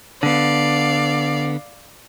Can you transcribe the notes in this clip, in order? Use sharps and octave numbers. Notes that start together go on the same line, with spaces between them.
D3 B3 D5 F5